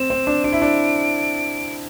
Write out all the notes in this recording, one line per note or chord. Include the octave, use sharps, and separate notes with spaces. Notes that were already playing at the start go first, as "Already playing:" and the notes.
Already playing: C4 E7
C4
D4
D4 D7
E4
D4